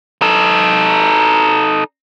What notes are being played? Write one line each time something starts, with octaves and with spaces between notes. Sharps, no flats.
D#4 A4